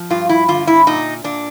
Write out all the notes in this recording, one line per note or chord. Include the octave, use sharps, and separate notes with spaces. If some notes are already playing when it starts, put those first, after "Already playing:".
Already playing: F3
G2 F4
E4
D3 F4
E4
A#2 D#4
A#2 D4